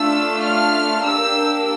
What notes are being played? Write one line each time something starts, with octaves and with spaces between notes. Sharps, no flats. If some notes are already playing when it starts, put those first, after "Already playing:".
Already playing: A3 D4 F4 A4 E6
F6
A#3 D4 G4 E6